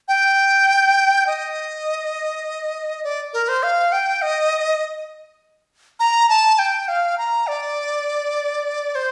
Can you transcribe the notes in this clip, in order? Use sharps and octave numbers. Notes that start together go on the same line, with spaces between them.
G5
D#5
D5
A#4
C5
F5
G5
D#5
A#5
A5
G5
F5
A#5
D5
C5